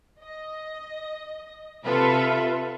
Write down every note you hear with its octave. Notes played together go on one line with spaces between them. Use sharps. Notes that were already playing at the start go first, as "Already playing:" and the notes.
D#5
C3 F4 A4 B4 E5